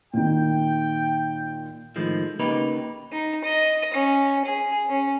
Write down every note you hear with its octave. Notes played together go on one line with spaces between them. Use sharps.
A#2 D#3 G5
A2 D#3 F3 G#3
C#3 A#3 B3 D#4 G4 B4
D#4
D#5
C#4
G#4
C#4